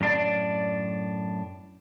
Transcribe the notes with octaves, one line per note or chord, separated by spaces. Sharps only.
F#2 A2 D4 C#5 D5